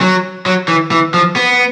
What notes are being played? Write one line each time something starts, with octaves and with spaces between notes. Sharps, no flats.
F#3
F#3
E3
E3
F3
B3